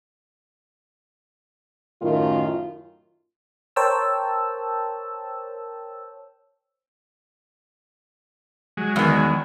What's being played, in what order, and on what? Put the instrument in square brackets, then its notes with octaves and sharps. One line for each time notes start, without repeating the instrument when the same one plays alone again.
[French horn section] F#2 A2 D#3 F4
[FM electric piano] A#4 C5 C#5 G5 A5 E6
[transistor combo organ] F#3 G#3
[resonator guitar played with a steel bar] E2 D#3